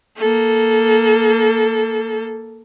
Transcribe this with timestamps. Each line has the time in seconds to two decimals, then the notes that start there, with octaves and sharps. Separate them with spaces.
0.18 A#3 A4